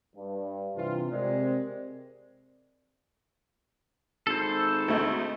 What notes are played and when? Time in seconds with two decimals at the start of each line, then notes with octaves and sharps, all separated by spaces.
0.16 G2
0.76 G2 C3 E3 F4
1.11 C3 G#3 C4 A#4 D5
4.27 G#1 A4 C5
4.88 D2 A3 D#4